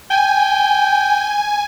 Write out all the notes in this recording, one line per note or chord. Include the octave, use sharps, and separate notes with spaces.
G5 G#5